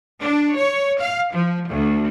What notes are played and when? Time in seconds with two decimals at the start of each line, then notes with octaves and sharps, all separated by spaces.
0.20 D4
0.57 C#5
1.00 F5
1.33 F3
1.68 D2